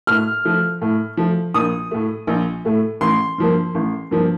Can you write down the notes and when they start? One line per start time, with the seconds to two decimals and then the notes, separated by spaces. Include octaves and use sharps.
0.07 A2 F6
0.45 F3 A3
0.82 A2
1.17 F3 A3
1.54 A#1 D#6
1.91 A2 A3
2.27 A#1
2.65 A2 A3
3.01 A1 C6
3.38 G2 F3 A#3
3.75 A1
4.11 G2 F3 A#3